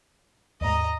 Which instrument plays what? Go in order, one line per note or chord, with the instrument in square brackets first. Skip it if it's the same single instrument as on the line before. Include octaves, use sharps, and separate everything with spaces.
[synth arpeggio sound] D#2 G#2 [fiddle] D#5 A#5